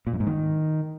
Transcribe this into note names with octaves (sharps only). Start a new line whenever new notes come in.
A#2
F#2
G#2
D#3